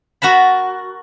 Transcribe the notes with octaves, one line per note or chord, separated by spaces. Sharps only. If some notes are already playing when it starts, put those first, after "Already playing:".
F#4 A#4 A5 B5